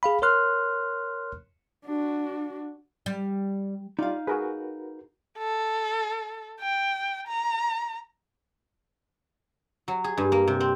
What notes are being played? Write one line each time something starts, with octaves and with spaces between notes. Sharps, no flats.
G#4 F5 B5
A#4 C#5 C6 F6 F#6
D4 F#4
G3
G3 D#4 F4 D5 F5
F#4 G#4 A#4 B4
A4
G5
A#5
F#3
G#4
G2
A#3
C3
C4